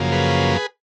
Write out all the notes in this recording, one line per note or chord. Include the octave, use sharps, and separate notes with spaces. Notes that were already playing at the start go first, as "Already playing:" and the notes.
Already playing: F#2 C#3 F3 A#3
G#4 B4